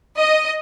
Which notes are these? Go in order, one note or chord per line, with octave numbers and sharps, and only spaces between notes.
D#5